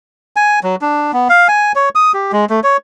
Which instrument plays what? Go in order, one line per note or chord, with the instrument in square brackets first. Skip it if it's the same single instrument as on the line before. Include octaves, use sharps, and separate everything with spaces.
[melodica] G#5
F#3
D4
B3
F5
G#5
C#5
D#6
G4
G#3
A3
C#5